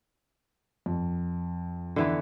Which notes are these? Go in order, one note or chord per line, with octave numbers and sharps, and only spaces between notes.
F2
D3 E3 B3